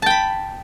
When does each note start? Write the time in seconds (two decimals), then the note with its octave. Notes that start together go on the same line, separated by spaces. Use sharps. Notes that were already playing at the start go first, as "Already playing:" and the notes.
0.02 A5
0.06 G5
0.10 B5